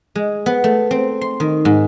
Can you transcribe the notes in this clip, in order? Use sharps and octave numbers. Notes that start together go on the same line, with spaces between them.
G#3
B3
A3
C4
C6
D#3
G#2